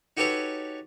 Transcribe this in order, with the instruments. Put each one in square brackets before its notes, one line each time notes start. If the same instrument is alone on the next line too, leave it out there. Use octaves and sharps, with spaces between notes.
[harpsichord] D#4 F#4 G4 A4 B4 C#5